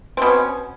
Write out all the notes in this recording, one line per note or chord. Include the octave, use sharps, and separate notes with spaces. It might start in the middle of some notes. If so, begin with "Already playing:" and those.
B2 C4 C#4